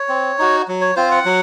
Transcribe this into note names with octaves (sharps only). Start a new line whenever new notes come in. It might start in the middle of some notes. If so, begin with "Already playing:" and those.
Already playing: C#5
C4
D#4 F#4
F#3
C#5
C4 F4 C5
F#5
F#3